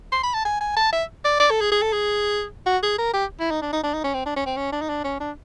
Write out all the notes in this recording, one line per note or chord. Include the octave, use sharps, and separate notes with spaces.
C6
B5
A5
G#5
G#5
A5
E5
D5
D5
A4
G#4
G#4
A4
G#4
F#4
G#4
A#4
G4
E4
D#4
D4
D#4
D4
D#4
C#4
C4
D4
C#4
C4
C#4
D4
D#4
D4
C#4
D4